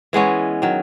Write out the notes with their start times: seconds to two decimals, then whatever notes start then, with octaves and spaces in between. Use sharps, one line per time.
0.13 E3 G#3 B3 C#4
0.62 D#3 F#3